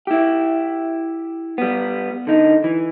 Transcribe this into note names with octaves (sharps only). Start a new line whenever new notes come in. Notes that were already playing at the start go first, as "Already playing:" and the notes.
E4 G4
G3 B3
D3 D#4
E3